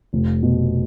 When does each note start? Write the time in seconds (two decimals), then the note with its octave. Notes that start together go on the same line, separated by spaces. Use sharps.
0.13 F1
0.43 B2